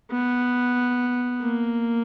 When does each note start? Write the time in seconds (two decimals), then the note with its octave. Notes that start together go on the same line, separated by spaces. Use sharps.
0.11 B3
1.42 A#3